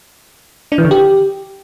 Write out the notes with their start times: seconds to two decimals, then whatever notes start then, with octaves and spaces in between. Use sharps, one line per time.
0.72 D4
0.78 E3
0.85 D3
0.91 G4